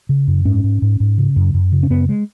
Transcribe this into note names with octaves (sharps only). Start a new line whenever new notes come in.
C#3
F#2
G#2 C#4
G#2
G#2
G#2
C#3
F#2
F#2
C#3
C#4
F#2 B3
G#3